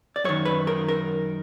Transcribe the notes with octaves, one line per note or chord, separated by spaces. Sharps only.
D5
F#2 D#3 C#5
B4
A#4
A#4